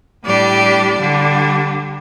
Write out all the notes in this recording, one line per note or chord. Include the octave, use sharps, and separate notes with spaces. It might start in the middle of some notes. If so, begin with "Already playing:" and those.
A2 G3 D4 G4 D5
D3 G3 D4